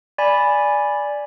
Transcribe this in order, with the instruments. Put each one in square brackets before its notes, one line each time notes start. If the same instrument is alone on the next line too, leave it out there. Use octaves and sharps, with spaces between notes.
[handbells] D5 G#5 B5